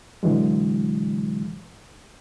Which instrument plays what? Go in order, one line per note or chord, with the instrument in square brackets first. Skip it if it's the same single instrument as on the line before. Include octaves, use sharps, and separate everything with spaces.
[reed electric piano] A#2 D3 E3 F#3 G#3